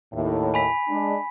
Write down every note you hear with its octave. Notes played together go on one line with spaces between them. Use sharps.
D#2 A2
G#5 B5 B6
G#3 D4